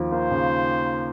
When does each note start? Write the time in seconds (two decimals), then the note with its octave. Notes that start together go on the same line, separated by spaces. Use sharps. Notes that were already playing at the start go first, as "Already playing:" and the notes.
Already playing: D#2 F3
0.12 A#3 C5
0.31 C#3